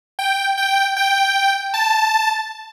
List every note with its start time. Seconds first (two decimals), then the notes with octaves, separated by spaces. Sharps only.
0.19 G5
0.57 G5
0.97 G5
1.74 A5